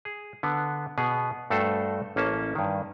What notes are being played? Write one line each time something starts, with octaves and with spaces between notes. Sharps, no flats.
G#4
D3 B3
B2 B3 G#4
G2 A3 F#4 A4 C5
A1 A#3 C#4 A5
G2 D#3